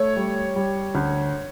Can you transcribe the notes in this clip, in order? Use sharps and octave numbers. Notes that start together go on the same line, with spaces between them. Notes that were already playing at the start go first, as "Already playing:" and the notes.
Already playing: A3 C#5
G3
G3
D2